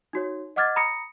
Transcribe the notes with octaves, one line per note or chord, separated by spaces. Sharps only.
D#4 F#4 C#5
D#5 F#5 D6 F6 G#6 A6
A#5 B5 D#6 A#6 C#7